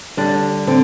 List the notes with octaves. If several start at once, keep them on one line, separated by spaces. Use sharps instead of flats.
D3 G3 D4
D3 C4